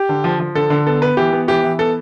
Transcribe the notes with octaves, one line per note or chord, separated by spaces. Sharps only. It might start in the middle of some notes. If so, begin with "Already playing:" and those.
Already playing: G4
D3
F3
F3
D3 A4
D3
B3 A4
B3 B4
E3 G4
B3
E3 G4
E3
B3 A4